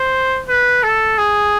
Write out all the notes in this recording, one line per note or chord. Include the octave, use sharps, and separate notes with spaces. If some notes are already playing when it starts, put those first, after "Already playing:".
Already playing: C5
B4
A4
G#4